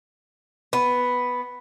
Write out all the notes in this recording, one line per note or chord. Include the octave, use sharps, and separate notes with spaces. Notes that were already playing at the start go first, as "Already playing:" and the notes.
B3